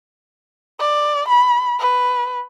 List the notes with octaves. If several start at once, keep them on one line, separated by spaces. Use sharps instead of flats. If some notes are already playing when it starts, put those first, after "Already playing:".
D5
B5
B4